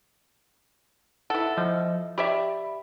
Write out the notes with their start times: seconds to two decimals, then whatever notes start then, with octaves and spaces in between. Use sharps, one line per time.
1.30 E4 A4 F#5
1.57 F3 D#5
2.18 G4 D5 E5 B5